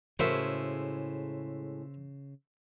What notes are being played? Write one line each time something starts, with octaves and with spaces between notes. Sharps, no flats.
A2 C#3 G#3 F#4 A#4 C5 E5